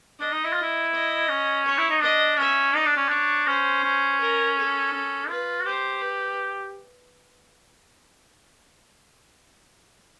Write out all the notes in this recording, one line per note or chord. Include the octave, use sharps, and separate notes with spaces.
D4 D#5
D#4
E4
F4
E4
D#5
C#4
C#5
E4
D#4
D4 D#5
C#4 E5
D#4 D5
D4
C#4
D4 C#5
C#4 C5
C#4
A#4
A4
C#4
F4 B4
F#4
G4 C5
B4